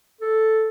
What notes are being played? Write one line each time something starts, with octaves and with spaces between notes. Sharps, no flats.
A4